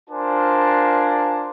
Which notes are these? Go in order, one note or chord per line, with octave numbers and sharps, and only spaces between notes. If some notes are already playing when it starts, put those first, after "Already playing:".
D4 F4 A#4 C5 G#5 A5